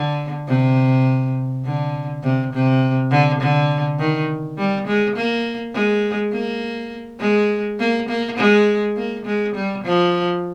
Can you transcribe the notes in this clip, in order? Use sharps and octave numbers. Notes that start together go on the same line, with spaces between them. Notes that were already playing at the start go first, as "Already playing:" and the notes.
Already playing: D3
C3
D3
C3
C3
D3
D3
D#3
G3
G#3
A#3
G#3
A#3
G#3
A#3
A#3
G#3
A#3
G#3
G3
F3